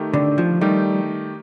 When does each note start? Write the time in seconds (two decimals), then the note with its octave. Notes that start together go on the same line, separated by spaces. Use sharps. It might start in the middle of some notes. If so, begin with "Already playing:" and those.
Already playing: D#3 A3 D#4 G4
0.14 D3
0.38 F3
0.61 D#3 G3 A3 D#4 G4